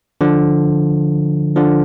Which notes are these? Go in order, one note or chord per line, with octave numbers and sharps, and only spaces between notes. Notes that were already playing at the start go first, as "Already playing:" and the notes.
D3 F3
D3 F3